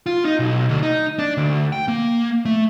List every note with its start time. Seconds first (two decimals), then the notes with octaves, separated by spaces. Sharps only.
0.06 F4
0.25 D#4
0.39 B1
0.69 D2
0.83 D#4
1.19 D4
1.37 D2
1.73 G5
1.88 A#3
2.45 A3